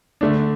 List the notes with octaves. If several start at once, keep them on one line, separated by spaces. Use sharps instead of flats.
D3 A3 D4